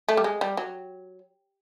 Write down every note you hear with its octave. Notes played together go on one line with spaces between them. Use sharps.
A3
G3
G#3
G3
F#3